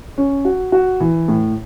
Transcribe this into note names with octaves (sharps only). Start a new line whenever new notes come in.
C#4
F#4
F#4
E3
A2